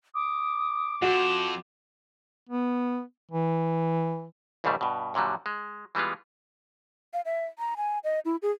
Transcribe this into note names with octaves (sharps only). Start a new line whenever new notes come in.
D6 D#6
F2 F#4 E7
B3
E3
A#1 D#2 G#2 C#3 G3 A3
G2 B2
F#2 A#2 D3 F#3 G3
G#3
E3 G3 G#3 B3 F4
F5
E5
A#5
G#5
D#5
E4
G#4